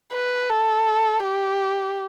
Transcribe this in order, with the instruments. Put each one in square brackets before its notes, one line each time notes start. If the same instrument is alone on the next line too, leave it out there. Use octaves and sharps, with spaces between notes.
[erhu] B4
A4
G4